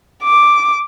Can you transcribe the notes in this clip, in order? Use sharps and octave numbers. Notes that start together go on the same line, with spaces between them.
D6